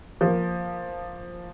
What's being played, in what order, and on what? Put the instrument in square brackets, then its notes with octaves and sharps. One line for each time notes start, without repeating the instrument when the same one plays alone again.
[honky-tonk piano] F3 A#3